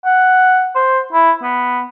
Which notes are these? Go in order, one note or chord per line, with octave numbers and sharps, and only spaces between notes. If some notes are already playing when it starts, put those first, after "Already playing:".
F#5
C5
E4
B3